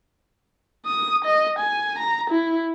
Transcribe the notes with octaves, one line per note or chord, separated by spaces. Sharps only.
D#6
D#5
G#5
A#5
E4